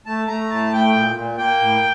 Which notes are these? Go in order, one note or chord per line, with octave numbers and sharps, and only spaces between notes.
A3 A5
A3 A#5
A2 A5
A3 G5
A#2
A#2
A#3 G5
A2